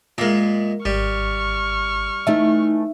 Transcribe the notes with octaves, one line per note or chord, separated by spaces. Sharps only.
A#2 G#3 A#4 E5
G#1 G3 C#6 F6
E3 A3 D#4 E5